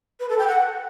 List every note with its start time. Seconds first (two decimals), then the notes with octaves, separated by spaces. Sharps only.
0.20 B4
0.29 A4
0.38 G5
0.48 F#5